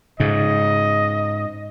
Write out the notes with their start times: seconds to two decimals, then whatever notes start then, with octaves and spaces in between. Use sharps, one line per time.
0.20 G#2 C#3 D#5